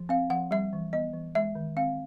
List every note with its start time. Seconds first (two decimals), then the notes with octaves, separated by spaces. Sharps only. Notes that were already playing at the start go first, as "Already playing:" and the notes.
Already playing: F3
0.09 C4 F5
0.30 F3 F#5
0.51 G3 E5
0.73 E3
0.93 B3 D#5
1.14 E3
1.35 G#3 E5
1.55 D#3
1.77 C4 F5